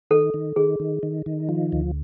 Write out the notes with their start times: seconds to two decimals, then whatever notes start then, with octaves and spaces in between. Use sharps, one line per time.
0.11 D#3 A4
0.34 D#3
0.56 D#3 G#4
0.80 D#3
1.03 D#3
1.26 D#3
1.49 F3
1.72 D2